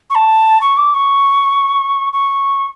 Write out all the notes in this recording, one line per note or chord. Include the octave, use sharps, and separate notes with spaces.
C#6
A5
C#6
D6
C#6
C#6